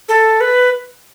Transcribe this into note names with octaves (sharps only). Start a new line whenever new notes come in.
A4
B4